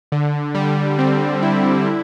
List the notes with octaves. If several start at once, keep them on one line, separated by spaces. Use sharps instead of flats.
D3
G3
C4
E4
D3